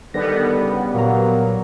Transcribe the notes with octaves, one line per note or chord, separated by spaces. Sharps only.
D3 D#3 G3 B3 A#6
C#3
A#2 F#3 A#3 A#5